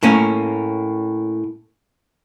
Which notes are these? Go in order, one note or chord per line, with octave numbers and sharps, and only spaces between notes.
A2 A#3 C#4